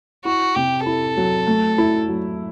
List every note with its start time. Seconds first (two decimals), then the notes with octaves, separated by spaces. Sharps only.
0.25 E4 F#4
0.55 C3 G4
0.86 E4 A4
1.17 F#3
1.47 A3
1.78 E4
2.08 F#3